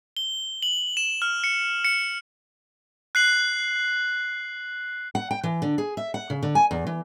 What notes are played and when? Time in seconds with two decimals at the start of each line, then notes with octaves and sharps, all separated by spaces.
0.17 G7
0.63 F#7
0.97 E7
1.22 F6
1.44 C#7
1.85 C#7
3.15 F#6 C7 F#7
5.15 F#5
5.31 G5
5.44 E3
5.62 D3
5.78 G#4
5.97 E5
6.14 F#5
6.30 C#3
6.43 D3
6.55 G#5
6.71 E2
6.87 E3